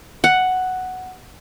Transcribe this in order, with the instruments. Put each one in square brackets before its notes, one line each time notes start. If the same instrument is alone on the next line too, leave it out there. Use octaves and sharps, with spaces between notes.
[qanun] F#5